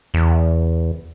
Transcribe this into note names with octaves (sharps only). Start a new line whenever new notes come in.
E2